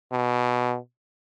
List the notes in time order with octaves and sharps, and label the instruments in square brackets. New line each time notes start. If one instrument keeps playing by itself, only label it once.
[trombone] B2